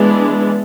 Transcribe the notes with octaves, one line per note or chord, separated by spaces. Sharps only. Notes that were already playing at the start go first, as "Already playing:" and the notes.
Already playing: E3 G#3 B3 D4